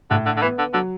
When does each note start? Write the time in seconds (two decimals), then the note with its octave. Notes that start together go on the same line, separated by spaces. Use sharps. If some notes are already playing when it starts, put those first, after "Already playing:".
0.11 A2 D3
0.26 D3
0.37 D3
0.42 E3 B3
0.59 D3
0.74 D3 F#3